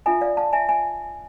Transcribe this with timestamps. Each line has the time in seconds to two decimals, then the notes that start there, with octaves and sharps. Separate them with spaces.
0.06 D4 F4 A4 E5 G#5
0.21 D5 F5
0.37 F5 A5
0.53 E5 G#5
0.69 E5 G#5